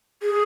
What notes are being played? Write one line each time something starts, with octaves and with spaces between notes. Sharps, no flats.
G#4